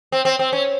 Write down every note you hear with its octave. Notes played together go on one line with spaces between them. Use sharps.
C4
C4
C4
C#4